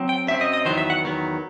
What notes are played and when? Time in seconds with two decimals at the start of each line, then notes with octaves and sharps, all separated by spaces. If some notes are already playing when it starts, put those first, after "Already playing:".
Already playing: F#3 C4
0.09 G5
0.27 F#2 F#3 C4 E5
0.41 D#5
0.53 D#5
0.65 E2 D#3 F#3 B3 C5
0.78 E5
0.90 F#5
1.02 E2 D#3 F#3 B3